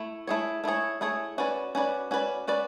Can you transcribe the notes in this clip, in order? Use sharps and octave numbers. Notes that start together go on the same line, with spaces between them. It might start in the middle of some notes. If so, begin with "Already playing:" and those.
Already playing: A3 E4
A3 E4 G#4 C#5
A3 E4 G#4 C#5
A3 E4 G#4 C#5
C#4 F#4 B4 D5
C#4 F#4 B4 D5
C#4 F#4 B4 D5
C#4 F#4 B4 D5